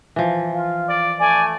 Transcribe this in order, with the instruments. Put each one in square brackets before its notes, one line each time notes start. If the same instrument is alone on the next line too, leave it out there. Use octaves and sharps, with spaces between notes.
[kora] E3 F3
[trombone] F4
[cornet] D5
[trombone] A3 [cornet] D5 [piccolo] G#5